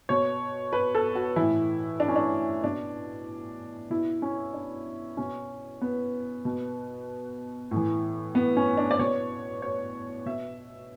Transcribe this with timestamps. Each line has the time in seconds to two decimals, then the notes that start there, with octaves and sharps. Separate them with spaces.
0.09 B2 C#5
0.73 B4
0.95 A4
1.15 F#4
1.36 E3 E4
1.42 A2
2.00 D4
2.08 C#4
2.16 D4
2.64 B2 D4
3.90 B2 E4
4.22 C#4
4.54 D4
5.17 B2 C#4
5.81 B3
6.45 B2
7.71 A2
7.76 E3
8.35 B3
8.57 C#4
8.77 D4
8.91 D5
8.99 B2 C#5
9.62 C#5
10.26 B2 E5